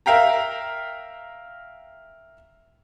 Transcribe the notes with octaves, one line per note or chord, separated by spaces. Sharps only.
A#4 E5 F5 G5 A#5